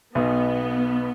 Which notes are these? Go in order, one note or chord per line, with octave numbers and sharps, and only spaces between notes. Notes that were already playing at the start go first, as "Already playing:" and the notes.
B1 B2 B3 D#5